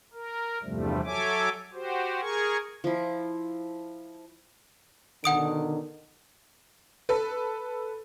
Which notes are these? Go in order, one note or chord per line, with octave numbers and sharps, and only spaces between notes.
A#4
E2 G2 C3 F3 G3 A3
F#3 A4 C#5 E5 G#5 D6
F#4 G4 C5
G#4 A#4 G#5 C#6
F3 E4
B2 D3 D#3 F#5 D#6 D7
A4 B4